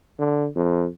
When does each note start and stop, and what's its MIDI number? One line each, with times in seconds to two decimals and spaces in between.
0.19 0.48 50
0.56 0.87 41